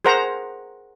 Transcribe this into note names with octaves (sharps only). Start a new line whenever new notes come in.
G#4 A#4 C5 F#5 A#5